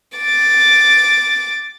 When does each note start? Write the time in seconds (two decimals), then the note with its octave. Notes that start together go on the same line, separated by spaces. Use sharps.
0.18 D6 A6